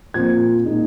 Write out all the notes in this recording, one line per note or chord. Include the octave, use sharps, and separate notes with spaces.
A#2 F3 C4 G#6
A#2 G#3 D#4